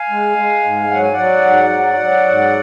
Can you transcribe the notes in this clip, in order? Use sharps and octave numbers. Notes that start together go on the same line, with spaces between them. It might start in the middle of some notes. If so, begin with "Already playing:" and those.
Already playing: F5 G#5
G#3
G#3
G#2
F#3 F#5
G#5
D5 F#5
F#3
G#2
F#3
F#3
G#2